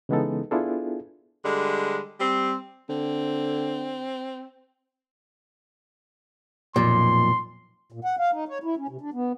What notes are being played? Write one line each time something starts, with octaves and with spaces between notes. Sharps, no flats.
C#3 E3 G#3 B3 D#4 A4
B3 D4 E4 F4 G#4 A4
D3 G3 G#3
G3 C4
D3 C4
B1 F2 A#2 C6
A#2
F#5
F5
D#4
C#5
E4
C#4
C3
D4
B3